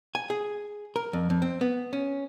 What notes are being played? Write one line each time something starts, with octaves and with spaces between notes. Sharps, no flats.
G#5
G#4
A#4
F2
F2
C4
B3
C#4